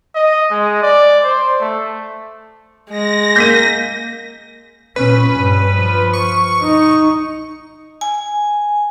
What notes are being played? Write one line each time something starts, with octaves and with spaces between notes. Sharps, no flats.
D#5
G#3
D5
C5
A3
G#3 A#6
A#3 G6 B6 D#7
A#2 C#4 B4
G2
F3
C#6
D#4
G#5